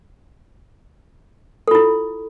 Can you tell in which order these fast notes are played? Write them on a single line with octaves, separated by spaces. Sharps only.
A4 F4 E4